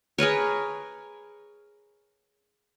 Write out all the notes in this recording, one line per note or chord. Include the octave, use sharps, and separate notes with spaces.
G#4 A#4 B4 C#5